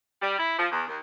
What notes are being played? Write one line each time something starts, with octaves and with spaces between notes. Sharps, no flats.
G3
E4
F3
E2
D#2